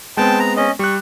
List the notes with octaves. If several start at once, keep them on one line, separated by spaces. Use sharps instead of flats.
G#3 B3 C4 G5 A5
A#5
C#4 D#5
G3 C#6 F#6